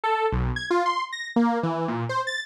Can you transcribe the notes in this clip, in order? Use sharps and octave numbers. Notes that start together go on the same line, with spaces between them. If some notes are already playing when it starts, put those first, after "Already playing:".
A4
B1
G#6
F4
C6
A#6
A#3
E3
A#2
C5
A6